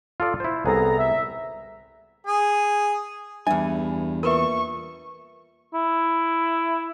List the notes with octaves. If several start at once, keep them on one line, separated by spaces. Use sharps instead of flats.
F4 A4 D5
E4 C5
C2 B3 G#4 A4 A#5
E5
G#4
E2 G2 E5 G#5
A#2 A#4 B4 E5 C#6
E4